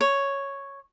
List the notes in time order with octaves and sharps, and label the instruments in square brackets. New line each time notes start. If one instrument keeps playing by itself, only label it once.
[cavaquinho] C#5